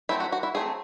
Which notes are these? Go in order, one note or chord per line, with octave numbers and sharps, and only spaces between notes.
F#3 A3 C4 E4
F#4
F#4
E4
F#3 A3 C4 G#4